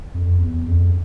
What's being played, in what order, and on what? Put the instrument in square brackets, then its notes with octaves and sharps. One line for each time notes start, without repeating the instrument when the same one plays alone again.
[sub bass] F2
E2
F2